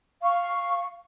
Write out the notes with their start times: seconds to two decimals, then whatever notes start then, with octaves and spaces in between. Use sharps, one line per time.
0.22 F5 C#6